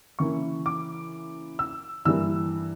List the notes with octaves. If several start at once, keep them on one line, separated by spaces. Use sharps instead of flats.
C#3 E3 A#3 E4 C#6
D6
E6
G2 E3 G3 A#3 E6